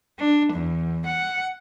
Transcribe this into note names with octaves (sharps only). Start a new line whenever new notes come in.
D4
E2
F#5